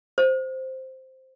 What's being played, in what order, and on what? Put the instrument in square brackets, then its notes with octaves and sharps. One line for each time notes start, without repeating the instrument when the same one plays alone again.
[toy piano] C5